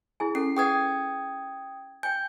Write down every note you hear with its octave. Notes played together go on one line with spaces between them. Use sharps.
E4 G#4 G#5
C#4 A4 C7
G#4 B4 F#5 G5 D#6 G#6
G5 G#5 G6